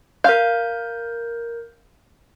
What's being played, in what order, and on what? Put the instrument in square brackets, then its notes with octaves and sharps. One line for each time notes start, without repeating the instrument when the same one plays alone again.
[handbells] A#4 G6 [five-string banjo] F5